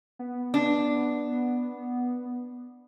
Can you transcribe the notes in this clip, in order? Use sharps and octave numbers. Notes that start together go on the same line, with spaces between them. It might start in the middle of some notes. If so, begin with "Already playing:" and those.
B3
D4